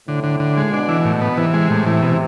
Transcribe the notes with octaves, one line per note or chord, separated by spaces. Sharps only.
A2 D3
D3
D3
G#3
B2 D4
E3
A2
B3
C3 E3
G#3
A2
E3
B2